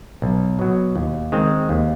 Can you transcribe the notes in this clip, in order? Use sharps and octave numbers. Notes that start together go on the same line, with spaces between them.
B1
B2 F#3
D#2
D#3 G#3 C4
D#2